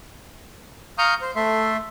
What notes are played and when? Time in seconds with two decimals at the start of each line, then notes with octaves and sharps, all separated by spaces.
0.98 F5 A#5 C#6 D#6 F6 G6
1.22 C5
1.36 A3 A4 E5 C6